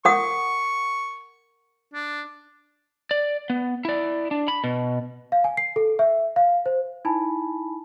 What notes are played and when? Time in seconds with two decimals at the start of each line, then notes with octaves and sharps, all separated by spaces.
0.05 A#4 F#5 C#6 D#6
1.94 D4
3.11 D5
3.50 B3
3.85 E4 D5
4.31 D4
4.48 B5
4.64 B2
5.32 F5
5.44 G#5
5.57 C7
5.76 A4
5.99 E5
6.36 F5
6.66 C5
7.05 D#4 E4 G#5 A5 B5